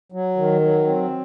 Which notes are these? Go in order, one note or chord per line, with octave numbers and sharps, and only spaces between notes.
F#3
D#3
F#3
C4